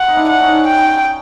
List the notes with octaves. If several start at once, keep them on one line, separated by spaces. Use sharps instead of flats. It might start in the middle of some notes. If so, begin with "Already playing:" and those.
Already playing: F#5
D#4
D4 E4
F#5
C#4 D#4
G5